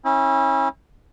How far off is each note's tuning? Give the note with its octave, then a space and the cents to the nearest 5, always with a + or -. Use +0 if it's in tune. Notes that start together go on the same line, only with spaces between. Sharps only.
C#4 -35 E4 -35